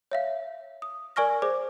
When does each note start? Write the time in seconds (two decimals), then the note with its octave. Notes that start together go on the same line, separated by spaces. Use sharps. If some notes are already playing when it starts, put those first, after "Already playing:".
0.11 C#5 E5 F5
0.82 D#6
1.16 A#4 D5 G#5 C#6 F6 A#6
1.42 G#4 C5 D5 D6